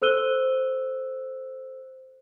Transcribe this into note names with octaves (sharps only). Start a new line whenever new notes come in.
A4 C5 E6 F#6 D#7 G7